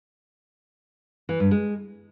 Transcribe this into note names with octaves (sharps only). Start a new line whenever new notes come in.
E3
G2
G#3